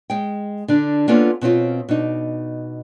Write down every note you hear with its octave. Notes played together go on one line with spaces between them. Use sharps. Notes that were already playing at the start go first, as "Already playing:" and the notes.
G#3 G5
D3 D4
A#3 B3 C#4 D4 F4 A4
B2 C4 C#4 F4
B2 D4 D#4